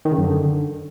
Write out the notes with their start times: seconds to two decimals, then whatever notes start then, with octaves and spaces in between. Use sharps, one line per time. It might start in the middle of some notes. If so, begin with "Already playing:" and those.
0.05 D#3
0.11 C#3
0.18 F#2
0.24 D3